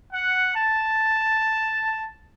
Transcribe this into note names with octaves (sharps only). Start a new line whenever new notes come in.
F#5
A5